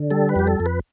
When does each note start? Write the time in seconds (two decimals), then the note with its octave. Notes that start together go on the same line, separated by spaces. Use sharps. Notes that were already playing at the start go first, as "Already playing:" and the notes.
Already playing: D3
0.11 G3 A4
0.29 B4
0.36 F2 G4
0.47 A4
0.60 F2
0.66 B4